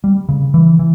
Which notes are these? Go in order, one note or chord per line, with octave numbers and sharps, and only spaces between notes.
G3
C#3
E3
E3